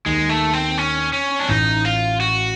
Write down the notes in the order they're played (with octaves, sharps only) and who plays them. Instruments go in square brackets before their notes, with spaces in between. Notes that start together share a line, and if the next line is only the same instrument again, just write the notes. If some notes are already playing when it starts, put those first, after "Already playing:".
[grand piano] D#2 D#3 [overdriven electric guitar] G#3
[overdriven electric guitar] A3
C4
C#4
C#4
D4
[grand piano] A1 A2 [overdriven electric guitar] D#4
[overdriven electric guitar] F4
F#4